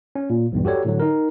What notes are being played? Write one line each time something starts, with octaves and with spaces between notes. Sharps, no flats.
C#4
A#2
B1 E2 G2
F#4 G4 A4 C#5 D5
A2 D3 F#3
D#4 A#4